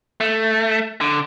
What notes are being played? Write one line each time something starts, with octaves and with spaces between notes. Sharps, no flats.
A3
D3